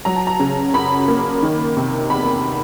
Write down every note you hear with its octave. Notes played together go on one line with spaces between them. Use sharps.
F#3 A#5
A5
A#5
C#3
F#2 B5
A#3
D#3
C3
E2 B5